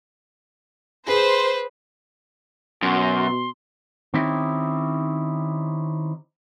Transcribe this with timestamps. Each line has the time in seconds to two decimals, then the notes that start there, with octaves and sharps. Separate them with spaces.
1.08 G#4 B4 C5
2.82 F#2 B2 C6
4.14 D#3 C4 C#4 D#4 E4 G4